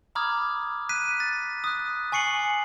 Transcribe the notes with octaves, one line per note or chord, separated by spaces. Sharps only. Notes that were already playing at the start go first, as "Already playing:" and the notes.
A#5 B5 D6 D#6 F6 G#6
F#6 B6 D#7
A6
D#6 F#6
G#5 C#6 C7 C#7 F#7